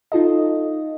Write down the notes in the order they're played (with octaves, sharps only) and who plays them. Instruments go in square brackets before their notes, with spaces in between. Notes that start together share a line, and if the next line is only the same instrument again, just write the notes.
[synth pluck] D#4 F4 A4 D#5